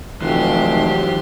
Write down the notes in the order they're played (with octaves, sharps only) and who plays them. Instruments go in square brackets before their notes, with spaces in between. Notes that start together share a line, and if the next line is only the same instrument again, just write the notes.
[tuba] F1 [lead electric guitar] E3 F#3 [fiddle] G4 C6